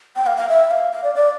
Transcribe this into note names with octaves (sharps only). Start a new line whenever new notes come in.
G5
F5
F5
E5
F5
F5
D5
D5